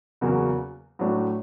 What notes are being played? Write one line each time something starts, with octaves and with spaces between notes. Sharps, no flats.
E2 C#3 F#3 A#3
A2 F#3 A3 D4